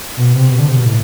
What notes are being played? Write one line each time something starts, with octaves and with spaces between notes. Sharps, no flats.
B2
C3
B2
D3
C3
B2
A2